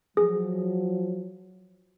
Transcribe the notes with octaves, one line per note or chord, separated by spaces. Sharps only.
F3 F#3 G#4